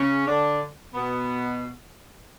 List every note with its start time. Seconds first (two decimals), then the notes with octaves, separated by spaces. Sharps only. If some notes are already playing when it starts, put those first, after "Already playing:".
Already playing: C#3 C#4
0.27 D3 D4
0.95 B2 B3